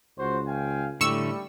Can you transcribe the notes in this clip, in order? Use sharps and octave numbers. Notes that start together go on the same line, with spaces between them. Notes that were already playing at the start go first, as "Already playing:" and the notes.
C#2 F#4 C5
F5 G5 G#5
A2 D3 G3 A3 C#6 E6